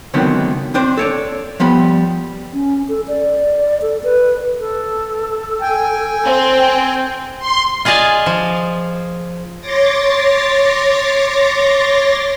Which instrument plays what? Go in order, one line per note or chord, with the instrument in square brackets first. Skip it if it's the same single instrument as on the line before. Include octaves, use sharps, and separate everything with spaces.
[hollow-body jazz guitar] C#2 D3 D#3 F#3 B3 C4
C4 D4 C5
A4 C#5 D5
F3 G3 B3 B5
[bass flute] C#4
A4
D5
A4
B4
[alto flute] A4
[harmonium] G5 G#5
[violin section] C4
[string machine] C6
[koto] F4 G#4 D5 D#5 F5 G#5
F3
[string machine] C#5 C6 D6 A6 A#6